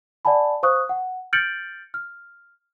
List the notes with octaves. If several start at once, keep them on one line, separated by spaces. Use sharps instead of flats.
D5 F#5 G#5 A5 B5
C5 F5 C#6 D#6 F#6
F#5
F6 G6 A6 C#7 D7 F#7
F6